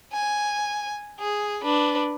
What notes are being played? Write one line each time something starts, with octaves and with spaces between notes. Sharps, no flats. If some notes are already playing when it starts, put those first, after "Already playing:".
G#5
G#4
D4 B4